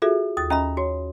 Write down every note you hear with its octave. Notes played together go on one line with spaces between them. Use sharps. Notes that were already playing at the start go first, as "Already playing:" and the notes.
F4 F#4 G#4 A4 E5
D#2 D#6 A6
C#4 D#5 E5 A#5 B5
F#4 C#5